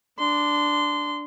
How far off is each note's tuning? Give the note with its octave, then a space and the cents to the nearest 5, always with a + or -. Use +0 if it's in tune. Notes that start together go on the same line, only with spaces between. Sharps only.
D4 +0 C6 -20